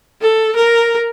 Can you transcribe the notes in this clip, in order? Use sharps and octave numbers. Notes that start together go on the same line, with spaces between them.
A4
A#4